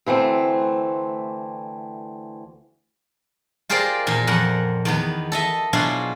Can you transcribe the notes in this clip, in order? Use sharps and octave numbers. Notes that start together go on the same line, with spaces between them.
D2 E3 A3 C4
F4 G4 G#4 A#4 C5 D5
E2 A#2 A#4
F2 A#4 F#5
E2 D#3 B3
A4 D#5 E5
B2 F#3 D4 E4 F4 G#4